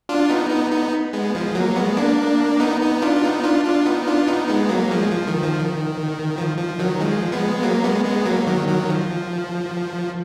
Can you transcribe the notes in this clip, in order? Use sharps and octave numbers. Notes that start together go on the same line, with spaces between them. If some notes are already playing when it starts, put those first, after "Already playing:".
D4 F4
B3 D#4
B3 D#4
B3 D#4
G#3 B3
F3 G#3
F#3 A#3
G#3 B3
A#3 D4
B3 D#4
B3 D#4
D4 F4
F4
B3 D#4
D4 F4
D4 F4
B3 D#4
D4 F4
B3 D#4
G#3 B3
F#3 A#3
F3 G#3
F3
D#3
F3
D#3
F3
F3
D#3 F#3
F3 G#3
G#3 B3
F#3 A#3
G#3 B3
G#3 B3
F#3 A#3
D#3 F#3
D#3 F#3
F3